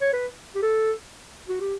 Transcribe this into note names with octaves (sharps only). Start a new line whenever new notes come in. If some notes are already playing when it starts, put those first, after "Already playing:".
C#5
B4
G4
A4
F#4
G4